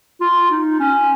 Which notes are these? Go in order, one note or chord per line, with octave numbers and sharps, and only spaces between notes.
F4
D#4
C#4